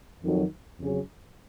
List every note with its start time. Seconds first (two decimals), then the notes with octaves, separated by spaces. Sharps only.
0.24 F2 D#3 F#3
0.79 F2 C#3 F#3 C#4 G#4